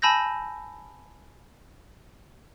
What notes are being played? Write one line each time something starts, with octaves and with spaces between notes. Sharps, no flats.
G#5 A5 B5 E6 G6 A#6